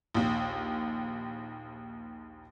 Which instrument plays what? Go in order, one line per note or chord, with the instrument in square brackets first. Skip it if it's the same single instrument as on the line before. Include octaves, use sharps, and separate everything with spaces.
[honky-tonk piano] A#1 D#2